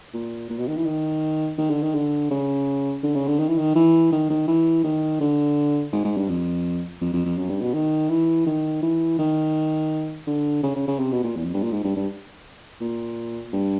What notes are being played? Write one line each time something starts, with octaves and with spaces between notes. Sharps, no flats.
A#2
A#2
B2
D#3
E3
D#3
D#3
D3
D#3
D3
C#3
D3
C#3
D3
D#3
E3
D#3
E3
D#3
D#3
E3
D#3
D3
G#2
G#2
G2
F2
F2
F2
F2
F#2
G2
B2
D#3
E3
D#3
E3
D#3
D3
C#3
C#3
C#3
C3
B2
A#2
E2
F2
G2
A#2
G#2
G2
G2
A#2
G2